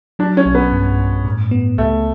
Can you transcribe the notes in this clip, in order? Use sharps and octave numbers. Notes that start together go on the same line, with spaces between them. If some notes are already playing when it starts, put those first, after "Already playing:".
F#3 D4
C#4
B1
B3
G2
G2
A2
B3
C#2 A3